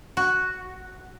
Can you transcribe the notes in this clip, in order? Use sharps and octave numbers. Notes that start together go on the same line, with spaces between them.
F#4